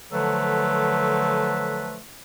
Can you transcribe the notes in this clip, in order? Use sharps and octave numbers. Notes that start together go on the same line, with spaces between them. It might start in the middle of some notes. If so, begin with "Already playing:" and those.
D3 F3 F#3 A3 A4 B4